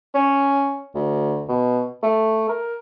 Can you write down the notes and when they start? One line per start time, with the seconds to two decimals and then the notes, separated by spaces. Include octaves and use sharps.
0.14 C#4
0.94 D2
1.49 B2
2.03 A3
2.49 A#4